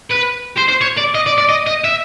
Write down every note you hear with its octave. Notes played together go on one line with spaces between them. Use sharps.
B4
C5
C5
C#5
D5
D#5
D5
D5
D#5
D#5
E5